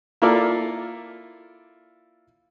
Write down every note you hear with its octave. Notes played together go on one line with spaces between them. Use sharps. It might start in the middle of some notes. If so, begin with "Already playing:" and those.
A#3 E4 F4 A4 A#4 D5